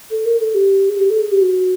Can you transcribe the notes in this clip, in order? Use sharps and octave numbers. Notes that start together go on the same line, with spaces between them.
A4
A#4
A4
G4
G#4
G4
A4
G#4
G4
F#4